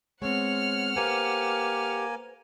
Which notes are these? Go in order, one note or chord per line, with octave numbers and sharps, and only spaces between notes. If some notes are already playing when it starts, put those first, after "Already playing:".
G#3 B3 C4 C#5 F#5 F6
A#3 G4 A4 B4 C5 G#5